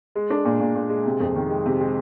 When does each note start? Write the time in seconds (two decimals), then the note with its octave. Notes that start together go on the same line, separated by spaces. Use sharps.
0.15 G#3
0.30 D4
0.45 A#2
0.60 A#2
0.75 A#2
0.89 G#3
1.06 C3
1.20 F2
1.35 D#3
1.50 G#3
1.66 C3
1.80 G#3